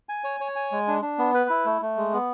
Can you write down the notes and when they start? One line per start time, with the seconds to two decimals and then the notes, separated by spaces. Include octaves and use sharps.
0.09 G#5
0.24 C#5
0.40 C#5
0.56 G#5
0.72 G#3
0.88 D4
1.02 D4
1.18 B3
1.34 B4
1.50 E4
1.65 A3
1.81 A3
1.97 G#3
2.13 B3